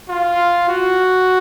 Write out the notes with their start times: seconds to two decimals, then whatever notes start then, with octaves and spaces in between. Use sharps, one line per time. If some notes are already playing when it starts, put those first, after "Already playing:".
0.09 F4
0.68 F#4